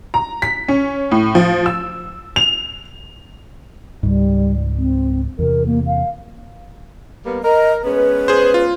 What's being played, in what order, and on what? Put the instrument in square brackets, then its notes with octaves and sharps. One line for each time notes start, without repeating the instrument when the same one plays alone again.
[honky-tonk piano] A#5
B6
C#4
A2
F3
E6
F7
[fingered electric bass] C#2 G#2 [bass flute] G3
[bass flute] C4
[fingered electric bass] E2 C3 [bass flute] A#4
[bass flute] A#3
F5
[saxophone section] G3 A#3 B3
[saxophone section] A#4 [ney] D#5
[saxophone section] G#3 B3 C#4 [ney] B4
[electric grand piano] G#4 C5
F4